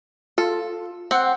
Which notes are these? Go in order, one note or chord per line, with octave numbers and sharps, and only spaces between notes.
F4 A4
C4 F#5